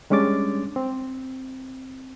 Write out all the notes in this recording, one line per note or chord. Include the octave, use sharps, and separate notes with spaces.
G3 G#3 C#4 D4 D6 A6
C4